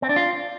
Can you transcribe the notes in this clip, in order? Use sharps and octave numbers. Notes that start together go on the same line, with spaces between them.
C4
D4
F4